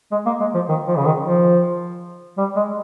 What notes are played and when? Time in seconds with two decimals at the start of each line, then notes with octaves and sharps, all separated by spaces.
0.11 G#3
0.26 A#3
0.40 G#3
0.54 F3
0.69 D#3
0.87 F3
0.96 C#3
1.05 D#3
1.25 F3
2.38 G3
2.56 G#3